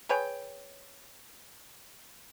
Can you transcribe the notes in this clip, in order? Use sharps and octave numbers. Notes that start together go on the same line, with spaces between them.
G#4 B4 C#5 G5